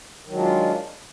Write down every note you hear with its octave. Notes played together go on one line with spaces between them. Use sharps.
D#3 F#3 G#3 D4 F4